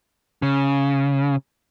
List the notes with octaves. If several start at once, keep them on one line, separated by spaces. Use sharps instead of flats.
C#3